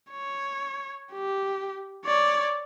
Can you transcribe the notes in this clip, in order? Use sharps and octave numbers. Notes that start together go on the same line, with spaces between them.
C#5
G4
C#5 D5